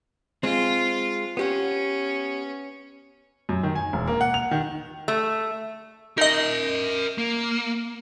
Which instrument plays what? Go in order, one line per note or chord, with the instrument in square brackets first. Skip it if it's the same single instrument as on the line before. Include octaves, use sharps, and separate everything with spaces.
[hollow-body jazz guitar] G#3 C4 [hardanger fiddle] F4
[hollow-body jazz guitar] B3 G4 F#5 [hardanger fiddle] C#4
[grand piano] F#2
D#3
G#5
E1
A#3
F#5
F7
D#3
[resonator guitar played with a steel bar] A3
[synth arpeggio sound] D#4 D#5 [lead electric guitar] A#4 E5
[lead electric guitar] A#3